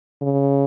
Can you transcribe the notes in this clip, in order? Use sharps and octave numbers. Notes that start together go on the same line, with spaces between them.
C#3